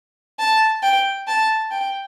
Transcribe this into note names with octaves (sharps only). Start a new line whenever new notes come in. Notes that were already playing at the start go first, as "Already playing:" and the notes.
A5
G5
A5
G5